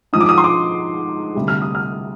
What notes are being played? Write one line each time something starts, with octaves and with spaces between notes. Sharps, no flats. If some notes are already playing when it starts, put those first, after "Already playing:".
G#2 F3 D#6
D6
D#6
C6
D6
D2 C3 G3
F6
D#6
F6